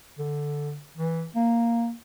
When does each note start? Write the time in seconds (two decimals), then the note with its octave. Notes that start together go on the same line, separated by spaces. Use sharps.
0.19 D3
0.97 E3
1.36 A#3